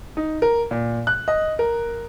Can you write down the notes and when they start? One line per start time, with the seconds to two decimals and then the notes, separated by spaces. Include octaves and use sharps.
0.17 D#4
0.42 A#4
0.71 A#2
1.07 F#6
1.28 D#5
1.59 A#4